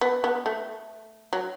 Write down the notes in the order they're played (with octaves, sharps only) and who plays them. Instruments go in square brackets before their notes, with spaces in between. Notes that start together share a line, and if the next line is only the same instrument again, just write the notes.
[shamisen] B3
B3
A3
F#3